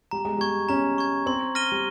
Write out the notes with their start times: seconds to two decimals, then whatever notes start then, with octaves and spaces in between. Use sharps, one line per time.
0.11 G3 A#5
0.25 G#3
0.38 G3 C#6 G#6
0.69 C#4 A#5
0.98 C#6 G#6
1.26 C4 C6
1.55 F6 A#6 D#7 G7
1.72 G3